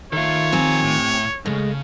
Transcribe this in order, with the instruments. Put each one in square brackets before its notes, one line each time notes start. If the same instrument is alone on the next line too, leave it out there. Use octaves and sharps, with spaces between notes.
[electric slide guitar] D#3 F4 [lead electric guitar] A4 E5 [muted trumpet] C#5
[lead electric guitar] F3 A#5 [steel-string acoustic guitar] C4 G4 G#5
[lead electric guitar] A2
[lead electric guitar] D2 C#3 [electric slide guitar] G#3 [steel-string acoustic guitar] A3